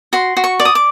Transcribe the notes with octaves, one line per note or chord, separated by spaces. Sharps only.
F#4 C6
F#4
C#6
D5
D#6
D6